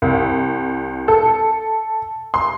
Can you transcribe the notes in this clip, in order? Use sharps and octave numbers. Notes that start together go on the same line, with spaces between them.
C2
A4
C6